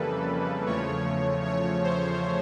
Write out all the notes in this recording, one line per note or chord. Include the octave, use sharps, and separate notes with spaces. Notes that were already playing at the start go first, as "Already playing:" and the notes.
Already playing: F2 C#3 E3 G3 A#3 A4 B4
E2 C#3 F3 A3 C#5
C#5
C5